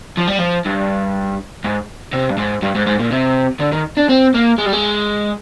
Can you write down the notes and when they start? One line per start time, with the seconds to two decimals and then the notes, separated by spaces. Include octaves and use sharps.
0.17 F3
0.27 G3
0.39 F3
0.65 G2
1.64 G#2
2.13 C3
2.30 G2
2.37 G#2
2.62 G2
2.75 G#2
2.87 G#2
2.99 A#2
3.11 C3
3.60 D3
3.72 D#3
3.97 D4
4.09 C4
4.34 A#3
4.58 G#3
4.66 G3
4.73 G#3